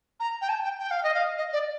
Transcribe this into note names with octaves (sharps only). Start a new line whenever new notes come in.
A#5
G5
A5
G5
G5
F5
D#5
F5
D#5
D5